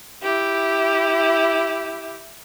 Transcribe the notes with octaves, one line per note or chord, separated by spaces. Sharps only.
E4 G4